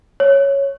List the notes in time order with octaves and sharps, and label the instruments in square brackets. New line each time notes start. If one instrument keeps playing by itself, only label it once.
[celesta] C#5